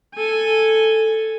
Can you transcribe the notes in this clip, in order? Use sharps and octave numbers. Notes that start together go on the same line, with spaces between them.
A4 G#5